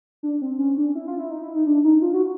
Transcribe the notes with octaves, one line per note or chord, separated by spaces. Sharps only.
D4
C4
C#4
D4
E4
F4
E4
D#4
E4
D#4
D4
D#4
F4
F#4